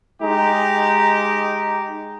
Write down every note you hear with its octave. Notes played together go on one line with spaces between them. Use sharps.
G#3 D#4 G4 A#5